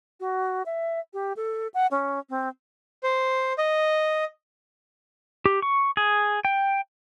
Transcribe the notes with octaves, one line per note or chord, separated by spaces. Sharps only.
F#4
E5
G4
A4
F#5
C#4
C4
C5
D#5
G4
C#6
G#4
G5